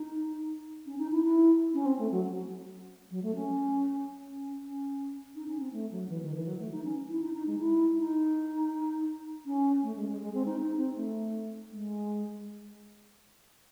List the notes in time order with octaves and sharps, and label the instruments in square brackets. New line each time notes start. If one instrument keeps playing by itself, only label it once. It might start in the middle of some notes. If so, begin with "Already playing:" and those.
Already playing: [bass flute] D#4
C#4
D#4
E4
E4
C#4
C4
A3
F#3
F#3
A3
C#4
C#4
C#4
D#4
C#4
C4
A3
F#3
E3
D#3
E3
F#3
A3
D#4
C#4
E4
D#4
D#4
G#3
E4
D#4
C#4
A3
G#3
G#3
G#3
C4
D#4
D#4
C4
A3
G#3